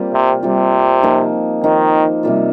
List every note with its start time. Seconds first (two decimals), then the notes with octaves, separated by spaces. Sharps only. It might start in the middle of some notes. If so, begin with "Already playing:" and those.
Already playing: G3 A#3 C4 F4 G4
0.13 C3
0.43 C3 G3 A#3 F4
1.03 F3 A#3 D#4
1.63 D#3 F3 A#3 D#4
2.23 C3 G3 A#3 F4